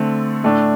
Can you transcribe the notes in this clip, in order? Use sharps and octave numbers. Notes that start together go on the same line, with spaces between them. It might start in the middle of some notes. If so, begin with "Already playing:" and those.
Already playing: D3 A3 C4
A2 A3 D4